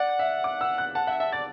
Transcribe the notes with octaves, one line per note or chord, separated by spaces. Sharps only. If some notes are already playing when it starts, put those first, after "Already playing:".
Already playing: D5 F#5
E5
D6
E6
F#6
F#5 A5
E5 F#5
E5 A5
D5 A6